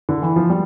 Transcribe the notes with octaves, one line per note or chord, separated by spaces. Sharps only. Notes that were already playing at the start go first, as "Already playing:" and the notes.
D3
E3
F3
G3